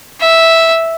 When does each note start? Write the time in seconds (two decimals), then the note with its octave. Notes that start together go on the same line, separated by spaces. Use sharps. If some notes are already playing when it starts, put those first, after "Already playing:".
0.20 E5